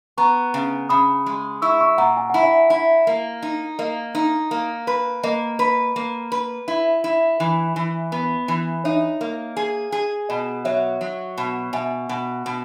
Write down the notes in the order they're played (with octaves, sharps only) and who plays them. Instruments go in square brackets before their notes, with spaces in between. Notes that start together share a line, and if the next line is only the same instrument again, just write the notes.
[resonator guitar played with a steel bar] B3 [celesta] A#5 C#6
[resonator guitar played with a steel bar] C#3
[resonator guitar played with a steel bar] C#3 [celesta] B5 D#6
[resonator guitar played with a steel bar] G#3
[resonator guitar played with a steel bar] E4 [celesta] C#6 E6
[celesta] C#6 E6
[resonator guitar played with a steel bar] A#2 [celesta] F#5 A#5
[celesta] G#5
[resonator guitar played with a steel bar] E4 [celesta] F#5
[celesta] E5 G#5
[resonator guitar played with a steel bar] E4
A#3
D#4
[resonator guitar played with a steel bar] A#3 [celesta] D#5
[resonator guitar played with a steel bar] D#4
A#3
B4
[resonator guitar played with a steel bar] A#3 [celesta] D#5
[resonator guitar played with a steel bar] B4
A#3
B4
E4
E4
E3
E3
B3
E3
[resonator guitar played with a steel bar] D#4 [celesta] C#5 E5
[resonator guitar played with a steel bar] A#3
G#4
G#4
[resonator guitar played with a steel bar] B2 [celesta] D#5
[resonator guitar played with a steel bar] F#3 [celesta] C#5 E5
[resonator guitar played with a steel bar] F#3
B2
[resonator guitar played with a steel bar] B2 [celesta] E5 G#5
[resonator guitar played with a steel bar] B2
B2